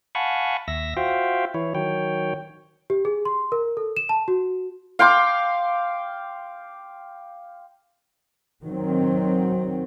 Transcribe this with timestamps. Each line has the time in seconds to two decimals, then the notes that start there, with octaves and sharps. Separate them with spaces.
0.15 F5 F#5 G#5 A5 B5 C#6
0.68 D#2 E5 E6 A#6
0.97 F4 F#4 C5 E5 F5 G5
1.54 E3 E4 C#5
1.75 D#3 F#3 C#5 G5
2.90 G4
3.05 G#4
3.25 C6
3.52 A#4
3.77 A4
3.97 E7
4.09 A5
4.28 F#4
4.99 F5 G5 C6 D6
8.64 D#3 F#3 C4